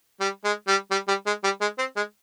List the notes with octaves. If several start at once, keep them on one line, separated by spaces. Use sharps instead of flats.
G3
G#3
G3
G3
G3
G#3
G3
G#3
C4
G#3